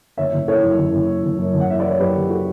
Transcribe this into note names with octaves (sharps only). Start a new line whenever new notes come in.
F#1 C#5 E5
F#1
E3 A4 C#5
F#2
F#1
F#1
E3
F#1
F#2
F#1
F#5
E3 E5
E3 D5
C#5
F#2 G4 B4
F#1
F#4 A4